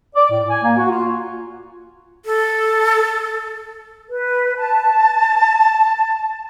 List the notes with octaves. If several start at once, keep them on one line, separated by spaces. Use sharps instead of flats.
D5
A2
G#5
A#3
F#4
F4
A4
B4
A5